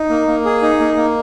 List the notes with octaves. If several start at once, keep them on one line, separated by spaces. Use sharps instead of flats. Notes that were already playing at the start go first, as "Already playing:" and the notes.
Already playing: D#4
A#3
A#3
G#4
D#4
A#3
A#3